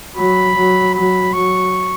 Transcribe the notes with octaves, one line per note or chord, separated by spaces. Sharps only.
F#3 B5
F#3
F#3 B5
F#3 C#6